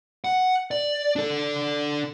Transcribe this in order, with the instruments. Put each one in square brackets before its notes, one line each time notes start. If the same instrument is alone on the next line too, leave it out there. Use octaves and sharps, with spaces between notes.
[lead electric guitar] F#5
D5
D4 A4